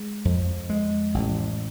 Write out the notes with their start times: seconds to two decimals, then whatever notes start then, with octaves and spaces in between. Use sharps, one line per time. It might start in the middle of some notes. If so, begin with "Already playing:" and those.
Already playing: G#3
0.25 F2
0.70 G#3
1.14 A1